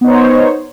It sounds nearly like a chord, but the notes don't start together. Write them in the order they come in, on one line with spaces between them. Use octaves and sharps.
B3 D#4 C5 C#5